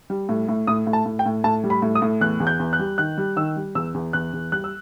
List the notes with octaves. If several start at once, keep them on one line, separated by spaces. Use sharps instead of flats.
G3
A2
A2
A2 D#6
A2
A5
A2
G5
A2
A2 A5
G3
B5
A2
D#6
A2
E2 F#6
E2
G6
E2
F#6
G3
D#3 F#6
G3
D#3 E6
G3
E2 E6
E2
E2 F#6
E2
G3 F#6
E6